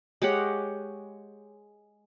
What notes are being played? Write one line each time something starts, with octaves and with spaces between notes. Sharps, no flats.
G#3 G4 C#5 F#5